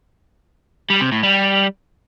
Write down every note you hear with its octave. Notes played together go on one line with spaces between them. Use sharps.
G3
C3
A2
G3